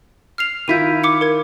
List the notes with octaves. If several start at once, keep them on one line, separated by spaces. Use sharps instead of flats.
F6 C7 F7
D#3 E4 F4 G6 B6 D#7
D6 C#7
A#4 G#6